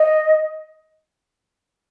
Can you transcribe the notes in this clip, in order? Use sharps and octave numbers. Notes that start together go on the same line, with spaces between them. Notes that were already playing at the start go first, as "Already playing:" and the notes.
Already playing: D#5